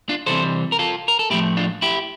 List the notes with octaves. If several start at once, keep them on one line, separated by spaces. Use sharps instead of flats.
D4 F4
C3 E3 G3 C4 A4 C5
A#4
F4 A4
A#4
A4
A2 F3 A3 E4 G4
D4 F4
E4 G4